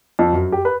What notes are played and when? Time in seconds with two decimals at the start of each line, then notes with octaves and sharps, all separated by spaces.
0.19 F2
0.33 F#2
0.52 G4
0.65 B4